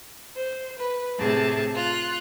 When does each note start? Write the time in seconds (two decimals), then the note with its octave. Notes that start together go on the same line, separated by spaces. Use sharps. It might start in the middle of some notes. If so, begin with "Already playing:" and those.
0.36 C5
0.79 B4
1.19 A2 C3 G#4 A4 A5
1.75 F4 F#6